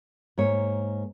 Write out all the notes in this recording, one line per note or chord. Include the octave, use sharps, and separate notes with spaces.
G#2 A#3 C#5